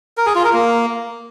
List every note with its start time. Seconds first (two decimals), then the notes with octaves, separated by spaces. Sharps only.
0.17 A#4
0.26 G#4
0.35 F4
0.44 A#4
0.53 A#3